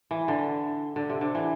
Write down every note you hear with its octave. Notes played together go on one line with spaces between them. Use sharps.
E3
D3
D3
C3
D3
E3